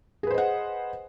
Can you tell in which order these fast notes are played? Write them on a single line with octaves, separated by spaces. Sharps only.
G#4 B4 C5 D#5 F#5